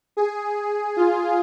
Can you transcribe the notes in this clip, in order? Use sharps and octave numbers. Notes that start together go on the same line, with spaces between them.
G#4
F4